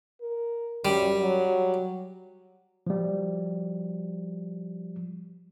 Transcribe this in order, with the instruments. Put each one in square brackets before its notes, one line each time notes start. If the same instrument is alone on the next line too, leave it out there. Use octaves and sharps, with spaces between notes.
[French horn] A#4
[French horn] F#2 [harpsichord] G3
[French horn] F#3
[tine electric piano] F3 G3